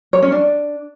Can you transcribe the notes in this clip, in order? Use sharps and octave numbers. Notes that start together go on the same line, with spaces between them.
C#5
C#4
D4